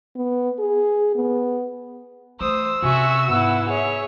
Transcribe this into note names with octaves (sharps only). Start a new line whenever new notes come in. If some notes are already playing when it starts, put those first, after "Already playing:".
B3
G#4
B3
E3 A3 C5 D#6 E6
C3 C#4 F#4 E5 G#5 C#6
G#2 B3 E4 F#5
G#4 C#5 E5